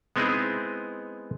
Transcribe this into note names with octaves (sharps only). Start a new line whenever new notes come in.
G#3 B3 C4 D#4 E4 G#4